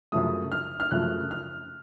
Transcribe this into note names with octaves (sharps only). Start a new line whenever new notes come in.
F#2 C#3 F3 A3 D#6
F6
F6
F#2 C#3 F3 A3 F#6
F6